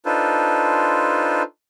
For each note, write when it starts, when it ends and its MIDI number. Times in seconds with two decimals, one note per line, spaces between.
0.05 1.43 62
0.05 1.43 63
0.05 1.43 65
0.05 1.43 69
0.05 1.43 71
0.05 1.43 72